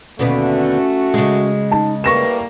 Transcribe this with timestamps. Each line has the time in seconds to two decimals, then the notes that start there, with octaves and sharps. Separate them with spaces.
0.19 D#2 B2 D3 A3 C#4 F#4
1.14 C#3 G#3
1.71 D#4 A5
2.04 A2 G3 A#3 B4 C#6 A#6 E7